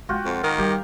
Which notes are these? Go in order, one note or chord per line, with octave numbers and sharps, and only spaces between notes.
G#3 B3 F4 F#4 G5
F2
D#3 A#4 A#5 D6
G3 G4